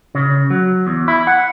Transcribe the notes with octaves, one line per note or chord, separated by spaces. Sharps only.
C#3
F#3
E2
E4
F#5